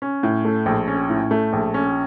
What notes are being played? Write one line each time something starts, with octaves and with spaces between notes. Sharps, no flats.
C#4
A2
A3
A#1
C#4
A2
A3
A#1
C#4